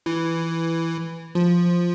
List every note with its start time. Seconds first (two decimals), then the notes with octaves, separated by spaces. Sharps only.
0.06 E3
1.35 F3